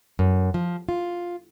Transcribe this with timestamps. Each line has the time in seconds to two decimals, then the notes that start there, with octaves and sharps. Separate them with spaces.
0.19 F#2
0.54 F3
0.89 F4